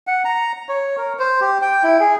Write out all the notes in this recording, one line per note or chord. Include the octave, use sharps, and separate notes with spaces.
F#5
A#5
C#5
A#4
C5
G4
G5
E4
G#4